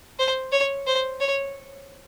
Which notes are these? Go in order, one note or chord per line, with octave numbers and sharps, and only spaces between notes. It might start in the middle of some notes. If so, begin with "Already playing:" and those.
C5
C#5
C5
C#5